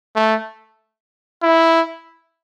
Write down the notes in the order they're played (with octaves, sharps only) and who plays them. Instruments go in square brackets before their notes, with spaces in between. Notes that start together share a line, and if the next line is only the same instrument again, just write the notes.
[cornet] A3
E4